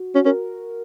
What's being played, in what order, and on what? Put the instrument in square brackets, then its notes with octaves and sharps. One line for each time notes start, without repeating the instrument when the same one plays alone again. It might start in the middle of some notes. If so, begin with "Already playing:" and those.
Already playing: [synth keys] F#4
[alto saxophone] C#4 [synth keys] F#4
[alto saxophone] C#4 [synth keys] A#4